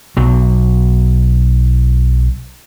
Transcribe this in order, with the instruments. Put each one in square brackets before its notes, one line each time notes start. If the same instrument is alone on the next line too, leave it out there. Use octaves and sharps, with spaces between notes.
[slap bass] B1 F#3